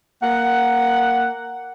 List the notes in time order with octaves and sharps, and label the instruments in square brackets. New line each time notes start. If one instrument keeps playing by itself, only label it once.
[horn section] A#3 F#5